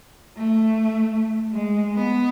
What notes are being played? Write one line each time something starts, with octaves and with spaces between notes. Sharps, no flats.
A3
G#3
B3